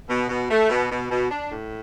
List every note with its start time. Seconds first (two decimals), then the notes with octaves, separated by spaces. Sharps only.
0.09 B2
0.29 B2
0.50 A3
0.69 B2
0.90 B2
1.10 B2
1.30 D4
1.51 A2